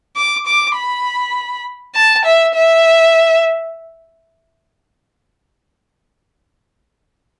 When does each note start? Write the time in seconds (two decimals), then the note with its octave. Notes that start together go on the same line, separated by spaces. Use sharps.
0.16 D6
0.47 D6
0.76 B5
1.95 A5
2.25 E5
2.54 E5